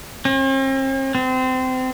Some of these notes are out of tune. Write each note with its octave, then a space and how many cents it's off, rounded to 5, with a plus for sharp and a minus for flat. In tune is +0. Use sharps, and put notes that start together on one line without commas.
C4 +45
C4 -25